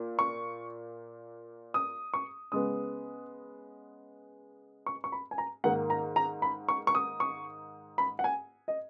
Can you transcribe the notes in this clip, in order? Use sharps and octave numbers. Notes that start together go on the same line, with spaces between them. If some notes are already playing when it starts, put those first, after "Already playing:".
Already playing: A#2
C#6
D#6
C#6
C#3 G#3 B3 D#6
C#6
C#6
B5
G#5
A#5
G#2 D#3 A#3 F#5
A#5
A#5
B5
C#6
C#6
D#6
C#6
B5
F#5
G#5
D#5